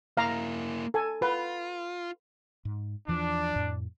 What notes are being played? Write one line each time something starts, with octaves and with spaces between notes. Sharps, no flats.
A#3 E4 F5 A#5
A4 G#5
F4 B4
G#2
E2 E3 F3 D4
F2 A2